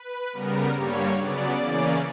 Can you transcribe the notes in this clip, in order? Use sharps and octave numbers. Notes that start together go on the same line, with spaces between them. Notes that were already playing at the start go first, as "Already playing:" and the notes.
Already playing: B4
C#3 G3 B3 A#4
G2 D3 G3 A#3 C#5
C#3 F#3 B3 D5
C#3 E3 A#3 C#4